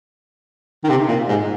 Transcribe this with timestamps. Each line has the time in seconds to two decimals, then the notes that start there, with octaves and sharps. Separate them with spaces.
0.84 D#3
0.90 C3
1.08 A#2
1.29 G#2